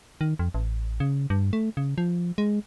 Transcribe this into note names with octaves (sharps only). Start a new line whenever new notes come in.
D#3
F2
A1
C#3
G2
A3
C#3
F3
G#3